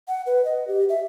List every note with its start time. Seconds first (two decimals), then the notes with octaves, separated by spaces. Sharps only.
0.08 F#5
0.26 B4
0.45 D#5
0.68 G4
0.89 E5